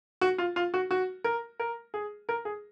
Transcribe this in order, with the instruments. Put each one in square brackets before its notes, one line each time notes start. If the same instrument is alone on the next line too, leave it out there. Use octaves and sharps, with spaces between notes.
[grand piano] F#4
F4
F4
F#4
F#4
A#4
A#4
G#4
A#4
G#4